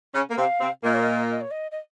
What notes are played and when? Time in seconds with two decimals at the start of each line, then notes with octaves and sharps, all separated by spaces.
0.14 C#3 C#4
0.31 A#3
0.37 C3 C4 F5
0.61 C3 C4
0.84 A#2 A#3 D#5
0.93 C#5
1.01 D#5
1.31 D#5
1.40 C#5
1.50 D#5
1.71 D#5